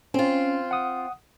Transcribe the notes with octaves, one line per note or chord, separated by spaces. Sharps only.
C4 C#4 F4
F#5 D#6